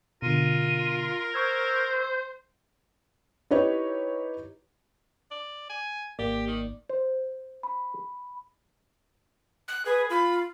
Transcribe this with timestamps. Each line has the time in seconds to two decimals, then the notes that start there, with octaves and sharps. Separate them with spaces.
0.22 B2 D3 F4 A#4 D#7
1.34 C5 C#6 E6 G6 G#6
3.51 D#4 E4 G4 B4 C#5
5.31 D5
5.70 G#5
6.19 G#1 A#3 G4 D5
6.47 D#3
6.89 C5
7.63 B5
9.68 F#6
9.86 G#4 B4
10.10 F4 B5